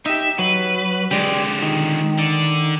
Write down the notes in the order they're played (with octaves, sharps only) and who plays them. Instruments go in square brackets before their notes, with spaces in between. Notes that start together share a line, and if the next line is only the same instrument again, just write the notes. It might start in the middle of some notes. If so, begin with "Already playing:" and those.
[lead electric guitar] D#4 G4 [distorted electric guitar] E5
[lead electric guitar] F#3 [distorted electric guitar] B4
[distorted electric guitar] D3 G#3 [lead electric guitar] G4 D5
[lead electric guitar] D#3
[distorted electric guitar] D3 D5